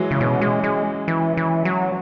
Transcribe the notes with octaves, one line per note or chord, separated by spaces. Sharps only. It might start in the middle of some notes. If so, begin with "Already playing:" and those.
Already playing: E3 F#3 G#3
C#3
B2 C#4
G#3
G#3
E3
E3
F#3